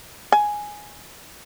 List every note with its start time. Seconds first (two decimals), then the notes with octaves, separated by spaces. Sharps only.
0.32 G#5